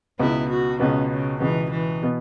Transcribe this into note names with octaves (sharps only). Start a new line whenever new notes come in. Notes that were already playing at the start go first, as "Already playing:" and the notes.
C#2 B2 B3 E4
F#4
C#2 B2 B3 C#4
C#3
C#2 B2 E3 B3
E3
B2 B3